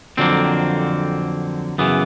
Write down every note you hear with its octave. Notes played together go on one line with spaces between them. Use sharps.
F2 D3 F#3 A#3 C4
F#2 C#3 E3 B3